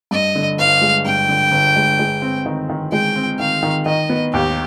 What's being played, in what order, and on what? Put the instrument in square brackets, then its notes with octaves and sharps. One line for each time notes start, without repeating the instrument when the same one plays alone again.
[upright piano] G2 [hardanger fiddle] D#5
[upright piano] D3
[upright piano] G1 [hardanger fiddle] F5
[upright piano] G#3
[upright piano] G2 [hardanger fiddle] G5
[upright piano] D3
G1
G#3
G#3
C4
D#3
D#3
[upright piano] G#3 [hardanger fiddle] G5
[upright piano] C4
[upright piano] D#3 [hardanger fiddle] F5
[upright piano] D#3
[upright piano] D#3 [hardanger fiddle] D#5
[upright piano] B3
[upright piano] D#2 [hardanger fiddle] G4